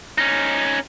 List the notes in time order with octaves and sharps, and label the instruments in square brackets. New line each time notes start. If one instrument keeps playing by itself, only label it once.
[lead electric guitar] C#4 D#4